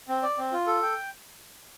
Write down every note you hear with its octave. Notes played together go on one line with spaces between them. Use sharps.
C4
D5
C4
F4
A4
G5